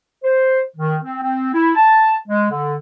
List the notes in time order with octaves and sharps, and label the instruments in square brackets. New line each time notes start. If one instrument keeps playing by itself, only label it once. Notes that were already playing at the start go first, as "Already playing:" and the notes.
[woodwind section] C5
D#3
C4
C4
E4
A5
G#3
D3